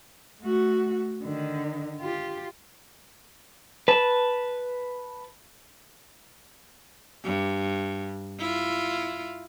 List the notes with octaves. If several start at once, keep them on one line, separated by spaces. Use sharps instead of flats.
A3 F#4
D3 D#3
F4 G4
B4 A5
G2
E4 F4